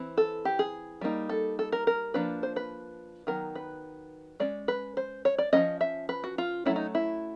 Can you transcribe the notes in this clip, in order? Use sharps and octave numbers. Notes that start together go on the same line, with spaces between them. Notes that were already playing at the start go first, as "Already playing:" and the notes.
Already playing: E3 C4
A4
G4
G#4
G3 A#3 D#4
A4
A4
A#4
A#4
F3 A#3 D4 B4
C5
B4
D#3 F#3 B3 A#4
B4
G#3 C#4 D5
B4
C5
C#5
D5
F3 A#3 C#4 D#5
E5
B4
F#4
F4
F#3 A3 C#4 E4
D#4
E4